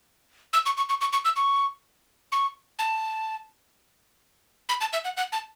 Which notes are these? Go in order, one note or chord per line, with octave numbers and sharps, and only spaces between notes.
E6
C#6
C#6
C#6
C#6
C#6
E6
C#6
C#6
A5
B5
A5
E5
F#5
F#5
A5